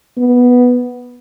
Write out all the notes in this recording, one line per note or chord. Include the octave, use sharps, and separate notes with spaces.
B3